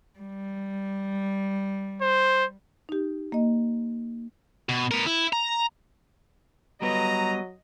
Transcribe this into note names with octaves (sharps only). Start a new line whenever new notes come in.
G3
C5
D#4 G4
A#3 D#5
B2
B3 A#4
E4
A#5
F#3 G3 B3 B4 D#5 A#5